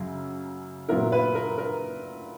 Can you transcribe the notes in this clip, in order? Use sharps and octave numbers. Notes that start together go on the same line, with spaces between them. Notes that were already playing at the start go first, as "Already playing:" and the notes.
Already playing: F#2 C#3 F#3
A#2 F#3 B3 E4 A#4
B4
A#4
A#4